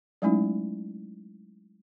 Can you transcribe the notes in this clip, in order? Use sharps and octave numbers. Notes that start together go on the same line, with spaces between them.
F#3 G#3 A3 C#4 D#4 E4